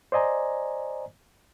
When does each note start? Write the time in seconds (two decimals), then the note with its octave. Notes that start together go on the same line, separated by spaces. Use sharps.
0.12 C5 D5 D#5 G#5 A#5